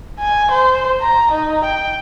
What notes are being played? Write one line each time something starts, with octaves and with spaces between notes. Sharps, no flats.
G#5
C5
A#5
D#4
G5